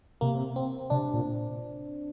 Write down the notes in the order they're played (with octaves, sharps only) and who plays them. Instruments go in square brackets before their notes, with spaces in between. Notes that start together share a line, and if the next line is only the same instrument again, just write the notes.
[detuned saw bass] C3 [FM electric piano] A#3
[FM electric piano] C4
[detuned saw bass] C3 [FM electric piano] D4
[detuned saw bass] A#2